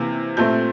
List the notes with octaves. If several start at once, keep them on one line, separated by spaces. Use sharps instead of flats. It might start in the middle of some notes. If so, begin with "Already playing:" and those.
Already playing: C3 E3 A#3
A#2 A3 C4 G6